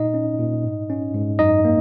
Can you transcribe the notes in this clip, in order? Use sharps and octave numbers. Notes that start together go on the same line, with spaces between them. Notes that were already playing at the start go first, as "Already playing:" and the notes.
Already playing: A#2 D#4 D#5
C#4
A#2
G#2
C#4
G#2
F#2 D#4 D#5
A#3